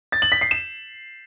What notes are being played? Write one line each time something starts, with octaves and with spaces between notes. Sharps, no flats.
A6
F#7
B6
C7
E7